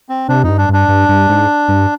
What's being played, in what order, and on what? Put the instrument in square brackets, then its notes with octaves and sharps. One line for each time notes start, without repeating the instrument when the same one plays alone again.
[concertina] C4
[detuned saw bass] C3 [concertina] D4
[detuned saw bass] F2 [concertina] D#4
[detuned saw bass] G2
[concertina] D4
[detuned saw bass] G2 [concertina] D4
[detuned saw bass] G2
G2
G#2
G2